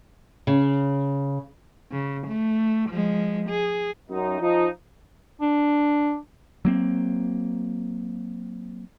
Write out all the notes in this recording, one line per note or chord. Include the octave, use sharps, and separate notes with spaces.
C#3
C#3
A3
F3 G#3
G#4
F#2 D#4
F3 D#4
D4
F#3 A#3 C4